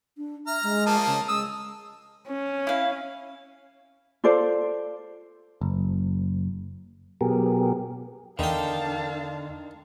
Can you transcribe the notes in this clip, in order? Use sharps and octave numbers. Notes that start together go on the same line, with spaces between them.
D4
E5 A#5 F6
G#3
F3 A#3 D#5 A5
C#3
G#3 D#6 E6
C#4
E4 F5
F4 A4 C5 D5
F#1
B2 F#3 B3 G4 G#4 A#4
E2 D3 D#3 F5 G5 A5